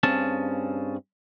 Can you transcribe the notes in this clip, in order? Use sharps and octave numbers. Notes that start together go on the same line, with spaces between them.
G2 C4 C#4 G#4 F5 A5